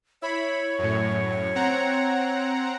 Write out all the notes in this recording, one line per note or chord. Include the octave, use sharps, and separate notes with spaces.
E4 C#5 B5
F#2 A2
C4 F#5 A#5